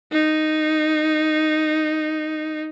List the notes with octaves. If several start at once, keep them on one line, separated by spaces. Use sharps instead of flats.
D#4